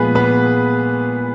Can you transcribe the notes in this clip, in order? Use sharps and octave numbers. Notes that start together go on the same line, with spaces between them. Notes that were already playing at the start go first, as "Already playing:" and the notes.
Already playing: A#2 F3 G#3 B3 G#4 B4
B3 B4